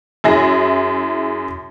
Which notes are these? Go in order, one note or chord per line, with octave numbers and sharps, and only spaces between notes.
F#2 E4 G#4 A#6